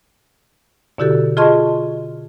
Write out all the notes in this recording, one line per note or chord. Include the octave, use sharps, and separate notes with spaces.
B2 D3 E4 F#4 G4 A4
F4 G#4 D#5 A5 C6 C#6